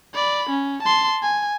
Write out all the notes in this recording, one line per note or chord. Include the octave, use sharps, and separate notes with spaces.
D5 B5
C#4
A5 C6
G#5